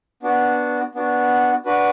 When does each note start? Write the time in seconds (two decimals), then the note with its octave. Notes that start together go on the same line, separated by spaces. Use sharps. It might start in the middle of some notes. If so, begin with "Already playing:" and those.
0.23 B3 D4 F#4
0.95 B3 D4 F#4
1.65 D4 F#4 B4